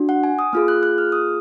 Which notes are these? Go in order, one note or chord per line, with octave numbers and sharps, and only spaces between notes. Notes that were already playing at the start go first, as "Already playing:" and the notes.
Already playing: D4 F#4
F#5
G#5
D#6
A#3 F4 G#4 F6
F#6
F#6
F6
D#6